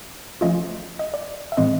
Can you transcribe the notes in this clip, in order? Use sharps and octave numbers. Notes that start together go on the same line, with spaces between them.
F3 A3 C#4 F4 D#5
D#5
D5
E5
A2 E3 G#3 C4 D#5